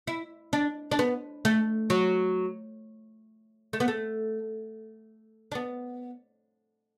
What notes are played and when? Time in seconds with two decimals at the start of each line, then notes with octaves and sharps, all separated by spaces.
0.07 E4
0.53 D4
0.91 D4
0.99 B3
1.45 A3
1.90 F#3
3.73 A3
3.80 B3
3.88 A3
5.52 D4
5.55 B3